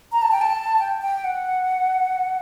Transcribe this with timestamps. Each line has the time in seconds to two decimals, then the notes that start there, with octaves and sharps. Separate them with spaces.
0.12 A#5
0.22 A5
0.32 G5
0.41 A5
0.79 G5
1.02 G5
1.24 F#5